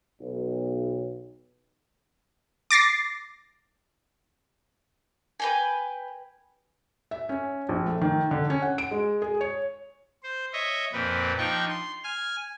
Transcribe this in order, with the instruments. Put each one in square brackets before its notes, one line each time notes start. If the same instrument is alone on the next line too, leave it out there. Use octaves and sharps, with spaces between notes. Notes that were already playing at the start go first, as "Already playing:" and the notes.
[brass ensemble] B1
[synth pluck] D6 A6 A#6 C7
[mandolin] B4 G5 G#5
[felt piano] E5
C#4
A#1
A3
D#3
D3
C#4
F#5
D7
G#3
G#4
C#5
[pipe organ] C5
C#5 D#5 E5
F2 A#2 C4 B4
F3 D4 D#4 G5 C#6
C6
G#5 F6